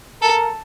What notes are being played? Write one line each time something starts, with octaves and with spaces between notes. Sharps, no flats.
A4 A#4